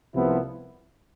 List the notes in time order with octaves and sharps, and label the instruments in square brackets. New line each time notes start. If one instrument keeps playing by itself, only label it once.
[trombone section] C2 C3 F3 B3 E4